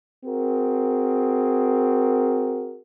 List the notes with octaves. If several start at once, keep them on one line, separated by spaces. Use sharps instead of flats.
C4 F#4 G#4 A#4